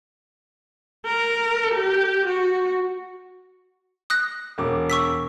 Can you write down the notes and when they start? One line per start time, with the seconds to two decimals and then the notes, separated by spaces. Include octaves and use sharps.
1.06 A#4
1.75 G4
2.26 F#4
4.10 D#6 F#6 A#6
4.58 E1 D6
4.90 C#6 E6 B6